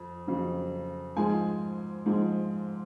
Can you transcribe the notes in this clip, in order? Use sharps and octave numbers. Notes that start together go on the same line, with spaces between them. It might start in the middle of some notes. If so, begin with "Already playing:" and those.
Already playing: F2
F2 C#3 F#3
G#2 F3 G#3 G#5
G#2 F3 G#3